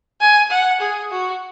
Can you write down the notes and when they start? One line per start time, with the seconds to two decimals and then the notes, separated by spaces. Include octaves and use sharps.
0.21 G#5
0.50 F#5
0.80 G#4
1.11 F#4